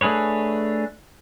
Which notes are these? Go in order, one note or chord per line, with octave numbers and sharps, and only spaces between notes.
A3 D4 G#4 B4 C#5